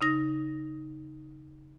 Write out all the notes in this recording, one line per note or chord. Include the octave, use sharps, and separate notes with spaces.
C#3 D#4 A#6